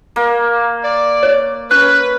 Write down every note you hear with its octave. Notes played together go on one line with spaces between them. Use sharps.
A#3
D5
C#5
C#4 B4 F#6